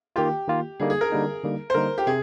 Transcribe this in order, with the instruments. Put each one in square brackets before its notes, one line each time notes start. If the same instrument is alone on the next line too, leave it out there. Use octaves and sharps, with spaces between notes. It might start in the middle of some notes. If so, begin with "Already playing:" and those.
[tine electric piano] D#3 A#3 F4 [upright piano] G4
[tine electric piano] D#3 A#3 F4
[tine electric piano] D3 G3 A#3 D#4 [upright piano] G#4
[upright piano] G#4
A#4
[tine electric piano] D3 G3 A#3 D#4
D3 G3 A#3 D#4
[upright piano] C5
[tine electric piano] D3 G3 A#3 D#4 [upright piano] A#4
[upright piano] G4
[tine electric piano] C3 [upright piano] G#4